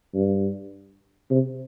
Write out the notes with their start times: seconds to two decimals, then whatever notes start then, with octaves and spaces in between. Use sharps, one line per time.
0.14 G2
1.31 C3